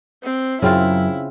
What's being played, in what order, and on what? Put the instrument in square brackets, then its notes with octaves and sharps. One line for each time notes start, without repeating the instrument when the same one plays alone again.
[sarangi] C4
[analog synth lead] F#2 [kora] C#3 C4 F4 [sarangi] E4